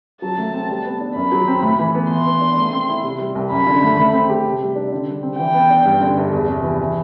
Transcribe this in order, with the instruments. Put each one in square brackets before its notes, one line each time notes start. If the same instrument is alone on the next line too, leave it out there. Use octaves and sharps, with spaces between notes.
[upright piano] F#3 [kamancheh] A5
[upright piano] A3
C4
G3
B3
D4
[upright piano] F#2 [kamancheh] B5
[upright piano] F#3
C4
A2
E3
B3
[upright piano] E3 [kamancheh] C6
[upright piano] B3
D4
A3
C4
E4
C3
G3
C2
[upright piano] F#2 [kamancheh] B5
[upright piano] D3
A3
A3
C4
G4
C3
G3
D4
D3
G3
C4
[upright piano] E3 [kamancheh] G5
[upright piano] B3
D4
G2
D3
G1
E2
C3
E3
E3